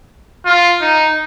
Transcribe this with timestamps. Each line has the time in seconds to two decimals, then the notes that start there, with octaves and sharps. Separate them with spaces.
0.46 F4
0.81 D#4